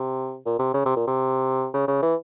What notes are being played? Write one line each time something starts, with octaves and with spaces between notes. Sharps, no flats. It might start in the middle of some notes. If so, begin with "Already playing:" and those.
Already playing: C3
A#2
C3
C#3
C3
A#2
C3
C#3
C#3
E3